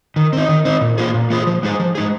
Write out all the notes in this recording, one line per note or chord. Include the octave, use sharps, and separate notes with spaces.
D#3
C4 D#4
D#3
C4 D#4
A#2
A#3 F4 G#4
A#2
A#3 F4 G#4
F3
G#3 D#4 G#4
F3
G#3 D#4 G#4